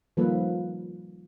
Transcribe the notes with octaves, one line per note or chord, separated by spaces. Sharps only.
D#3 F3 G3 A#3 A4 B4